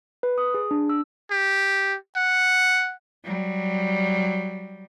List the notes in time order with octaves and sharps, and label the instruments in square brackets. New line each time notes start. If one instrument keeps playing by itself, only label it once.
[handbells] B4
D#6
G#4
D4
E6
[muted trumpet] G4
F#5
[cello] F#3 G3